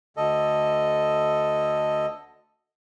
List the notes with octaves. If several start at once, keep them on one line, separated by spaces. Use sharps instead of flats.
D2 D3 A4 D#5